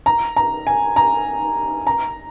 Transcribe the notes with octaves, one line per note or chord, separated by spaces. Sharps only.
A#5
A#5
G#5
A#5
A#5